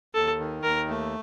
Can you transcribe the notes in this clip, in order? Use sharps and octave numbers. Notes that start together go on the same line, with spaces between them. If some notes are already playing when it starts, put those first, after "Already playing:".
D#2 A4
D#3
D#2 A#4
A3